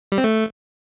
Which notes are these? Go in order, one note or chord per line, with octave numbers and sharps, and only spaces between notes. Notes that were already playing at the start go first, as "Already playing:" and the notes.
G3
C4
A3